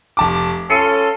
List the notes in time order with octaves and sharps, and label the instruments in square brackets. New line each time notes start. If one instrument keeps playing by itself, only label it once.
[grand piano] F1 A5 D6
[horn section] C#4 F4 A4 [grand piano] C7 C#7 D#7